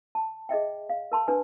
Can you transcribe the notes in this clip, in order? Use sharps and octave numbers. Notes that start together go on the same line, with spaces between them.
A5
G#4 D#5 E5 G5
F5
A#4 A5 C6
D4 B4 G#5